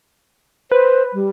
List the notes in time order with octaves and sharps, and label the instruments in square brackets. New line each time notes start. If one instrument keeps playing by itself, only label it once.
[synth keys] B4 [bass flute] C5
[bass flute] G3